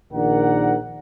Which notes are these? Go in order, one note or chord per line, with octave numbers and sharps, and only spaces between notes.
A#1 D#3 A#4 D5 F#5